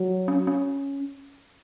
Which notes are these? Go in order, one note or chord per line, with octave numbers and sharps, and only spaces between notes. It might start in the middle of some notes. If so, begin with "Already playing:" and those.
Already playing: F#3
C#4
C#4